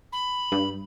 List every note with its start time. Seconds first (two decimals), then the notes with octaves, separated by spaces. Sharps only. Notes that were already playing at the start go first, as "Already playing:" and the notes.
0.12 B5
0.52 G2